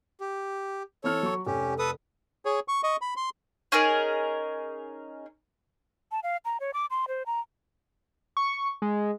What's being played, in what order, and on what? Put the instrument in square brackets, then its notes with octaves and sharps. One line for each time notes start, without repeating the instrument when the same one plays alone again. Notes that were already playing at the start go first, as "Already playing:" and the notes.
[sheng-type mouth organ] G4
[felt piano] E3 C4 F6 [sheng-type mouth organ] A4 C#5
[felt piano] F#3 C#6
[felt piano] F1 [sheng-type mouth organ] C#4 G4
[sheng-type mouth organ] A4 B4 D#6
[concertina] G#4 C#5
C#6
D#5 C#6
B5
C6
[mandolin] C#4 D#4 G#4 A#4
[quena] A5
F5
A#5
C#5
D6
C6
C5
A#5
[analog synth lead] C#6
G#3